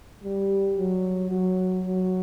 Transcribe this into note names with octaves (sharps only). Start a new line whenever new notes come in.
G3
F#3
F#3
F#3